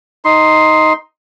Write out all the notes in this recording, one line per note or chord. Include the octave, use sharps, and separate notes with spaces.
D#4 C6